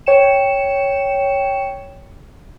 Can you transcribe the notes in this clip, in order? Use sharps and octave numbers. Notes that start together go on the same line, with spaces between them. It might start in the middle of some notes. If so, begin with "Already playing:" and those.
C#5 G5 C#7 E7